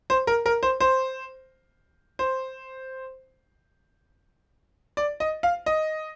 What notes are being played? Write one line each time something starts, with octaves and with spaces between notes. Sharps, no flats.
C5
A#4
A#4
C5
C5
C5
D5
D#5
F5
D#5